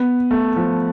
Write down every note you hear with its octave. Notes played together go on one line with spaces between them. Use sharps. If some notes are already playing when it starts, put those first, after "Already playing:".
Already playing: B3
A3
F3